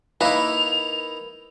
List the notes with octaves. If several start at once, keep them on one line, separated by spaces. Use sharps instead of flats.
A#3 D#4 E4 B4 F7